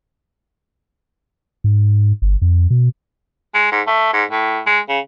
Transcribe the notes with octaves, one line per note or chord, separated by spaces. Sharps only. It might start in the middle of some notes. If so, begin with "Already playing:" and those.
G#2
G1
F2
B2
G#3
G#2
A3
G#2
A2
G#3
C#3